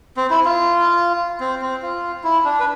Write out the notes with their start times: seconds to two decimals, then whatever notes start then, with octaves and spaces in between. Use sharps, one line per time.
0.17 C4
0.30 E4
0.45 F4
1.41 C4
1.62 C4
1.83 F4
2.24 E4
2.45 D4
2.60 B4